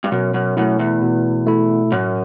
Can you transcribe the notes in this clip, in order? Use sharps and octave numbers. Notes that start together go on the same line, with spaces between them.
G2
F#2 B2
F#2
F#2 A3 E4
E2
B2
A3 E4
F#2 A2